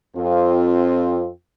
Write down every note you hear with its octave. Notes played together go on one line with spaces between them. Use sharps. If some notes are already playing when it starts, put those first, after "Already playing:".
F2 C4 F4